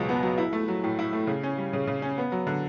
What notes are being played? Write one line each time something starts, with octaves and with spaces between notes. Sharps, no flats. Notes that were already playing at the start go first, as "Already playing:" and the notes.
Already playing: C#2 B2 F#3
B3
F#3
E4
A3
F#3
A2
E4
A3
C#3
C#4
G3
C#3
C#3
C#4
B3
F#3
D3